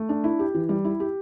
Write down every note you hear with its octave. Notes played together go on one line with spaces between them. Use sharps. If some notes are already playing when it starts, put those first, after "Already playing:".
Already playing: A3
D4
E4
G4
E3
G3
E4
G4